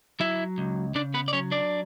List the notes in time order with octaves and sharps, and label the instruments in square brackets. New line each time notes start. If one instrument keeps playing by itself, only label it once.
[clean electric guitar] F#3 E4 E5
C#2
C#3 D4 D5
B3 B4
D5
F#3 C#4 C#5
D4 D5